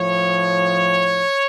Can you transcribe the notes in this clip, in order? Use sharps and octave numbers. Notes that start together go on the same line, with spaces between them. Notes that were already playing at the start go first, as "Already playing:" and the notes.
Already playing: A2 F3 C#5